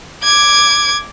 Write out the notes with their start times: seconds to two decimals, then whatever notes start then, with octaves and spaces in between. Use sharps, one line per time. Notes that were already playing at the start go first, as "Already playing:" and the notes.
0.23 D6 G#6